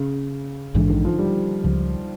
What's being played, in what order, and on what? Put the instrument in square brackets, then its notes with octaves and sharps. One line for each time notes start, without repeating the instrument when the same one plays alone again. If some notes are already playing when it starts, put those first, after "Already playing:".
Already playing: [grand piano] C#3
[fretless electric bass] A#1 G#2 E3 G#3 [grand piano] D3
[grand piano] D#3
F3
G3
[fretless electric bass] C#2 C#3 F3